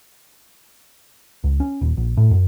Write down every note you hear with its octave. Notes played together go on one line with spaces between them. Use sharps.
C#2
C#4
D#1
A#1
A2
F#2